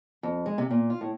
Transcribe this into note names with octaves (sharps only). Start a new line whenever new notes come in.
F2
G#3
C3
A#2
F4
A2